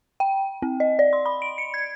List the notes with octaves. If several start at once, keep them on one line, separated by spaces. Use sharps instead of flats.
G5
C4
D#5
D5
C6
B5
D7
C#7
G#6